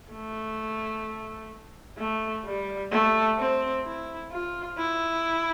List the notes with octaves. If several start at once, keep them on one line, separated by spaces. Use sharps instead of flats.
A3
A3
G3
A3
C4
E4
F4
E4